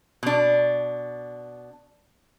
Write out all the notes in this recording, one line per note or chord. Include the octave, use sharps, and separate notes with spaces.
B2 D4